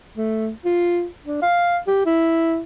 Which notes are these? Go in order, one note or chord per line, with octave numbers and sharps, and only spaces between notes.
A3
F4
D4
F5
G4
E4